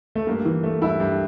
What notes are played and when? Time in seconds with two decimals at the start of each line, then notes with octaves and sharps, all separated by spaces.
0.15 A3
0.27 G2 A#3
0.45 E3
0.63 A3
0.82 G2 E4
1.00 G2